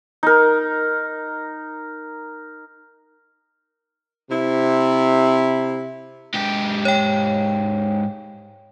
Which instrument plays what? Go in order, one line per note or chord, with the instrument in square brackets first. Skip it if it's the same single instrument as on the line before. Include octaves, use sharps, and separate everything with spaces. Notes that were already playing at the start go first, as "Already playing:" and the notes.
[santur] D#4 A#4
[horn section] C3 E4
[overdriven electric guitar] G#2 G4
[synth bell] C#5 G5